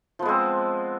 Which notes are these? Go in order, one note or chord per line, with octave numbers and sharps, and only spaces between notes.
F3 G#3 B3 C4